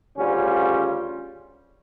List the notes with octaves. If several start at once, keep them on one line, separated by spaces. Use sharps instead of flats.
D2 C#3 G3 C#4 F4